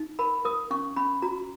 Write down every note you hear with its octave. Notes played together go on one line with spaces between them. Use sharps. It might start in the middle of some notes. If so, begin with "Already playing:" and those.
Already playing: D#4
A#4 B5
A#4 D#6
C#4 C#6
C#4 B5
F#4 A#5